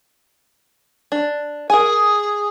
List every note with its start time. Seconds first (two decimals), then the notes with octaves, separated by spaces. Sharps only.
1.12 D4
1.70 G#4 A#4 G#5